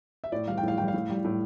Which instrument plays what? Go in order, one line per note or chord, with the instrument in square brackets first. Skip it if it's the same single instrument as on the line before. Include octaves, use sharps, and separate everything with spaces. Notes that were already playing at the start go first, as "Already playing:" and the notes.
[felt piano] E5
A2 D5
E3 G3 F5
G5
A2 F5
E3 G3 G5
F5
A2
G3
A2